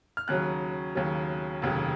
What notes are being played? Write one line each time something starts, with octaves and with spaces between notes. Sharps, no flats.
F6
D#2 C#3 F#3 F#6
D#2 C#3 F#3
F1 D#2 C#3 F#3